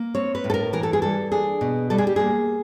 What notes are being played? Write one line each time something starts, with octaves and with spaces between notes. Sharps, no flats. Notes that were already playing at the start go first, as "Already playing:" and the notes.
Already playing: A#3
C4 C#5
B4
A2
A4
A#4
E3 A#4
A4
G#4
G3 A4
D4 G#4
B2
G3 A4
G#4
G4
A#3 G#4